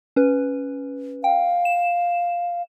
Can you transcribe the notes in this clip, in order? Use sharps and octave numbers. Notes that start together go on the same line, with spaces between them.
C#4 B4
F5 G5
E7